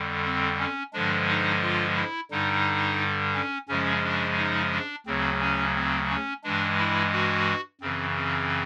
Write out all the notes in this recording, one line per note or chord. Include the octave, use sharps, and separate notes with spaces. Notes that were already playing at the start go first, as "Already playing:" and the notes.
Already playing: F2 D3 G3
C4
C#4
G2 D3 F3 G#3 D4
D#4
F4
E4
G2 D3 G3 D#4
C#4
F#2 C#3 F3 G#3 C#4
D4
D#4
D4
D2 C#3 F#3 C4
C#4
C4
C#4
G2 E3 G#3 D4
E4
F#4
F#2 C#3 E3 C4
C4